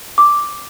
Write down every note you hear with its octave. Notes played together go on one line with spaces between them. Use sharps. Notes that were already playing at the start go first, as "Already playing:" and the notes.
D6